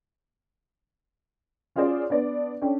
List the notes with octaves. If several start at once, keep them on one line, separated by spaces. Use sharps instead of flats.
C#4 F4 F#4 G#4 C5 D5
B3 D4 D5
C#4 D4 A4 G5